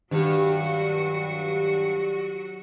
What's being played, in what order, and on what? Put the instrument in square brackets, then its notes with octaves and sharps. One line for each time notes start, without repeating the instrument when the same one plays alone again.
[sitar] G2 [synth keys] D#3 G4 [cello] F#3 F#4